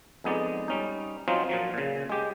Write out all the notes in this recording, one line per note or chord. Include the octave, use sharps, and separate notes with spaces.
F2 G#3 B3 D#4 D5
G3 C#4 D#4
F3 F#3 C4 C#4 D#4 F4
A#2 F3 F#3
A#2 C#3
G#3 G4